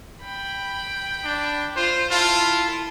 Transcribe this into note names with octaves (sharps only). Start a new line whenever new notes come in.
G5 B5
D4
F4 C5
E4 F4 A4